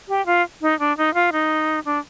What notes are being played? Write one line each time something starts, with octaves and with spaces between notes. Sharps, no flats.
G4
F4
D#4
D4
D#4
F4
D#4
D4